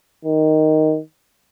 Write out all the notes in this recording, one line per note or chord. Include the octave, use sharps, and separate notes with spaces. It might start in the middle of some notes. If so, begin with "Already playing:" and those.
D#3